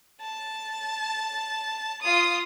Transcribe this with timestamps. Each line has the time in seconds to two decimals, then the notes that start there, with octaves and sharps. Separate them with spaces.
0.20 A5
2.01 F4 D#6